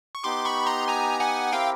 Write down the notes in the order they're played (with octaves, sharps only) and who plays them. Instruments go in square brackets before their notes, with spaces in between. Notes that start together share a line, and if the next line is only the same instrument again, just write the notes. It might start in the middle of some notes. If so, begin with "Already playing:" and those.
[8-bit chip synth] C#6
[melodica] B3 D#4 G4 [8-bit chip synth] C6 D6
[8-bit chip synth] B5 C#6
A#5 C6
G#5 A#5
F#5 G#5
[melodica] C4 E4 G4 A#4 [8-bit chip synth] F5 G5